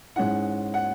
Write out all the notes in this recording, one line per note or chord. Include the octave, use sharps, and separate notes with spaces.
G#2 G#3 C#4 E4 F#5
F#5